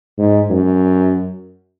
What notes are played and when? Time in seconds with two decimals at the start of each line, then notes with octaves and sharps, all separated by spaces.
0.18 G#2
0.50 F#2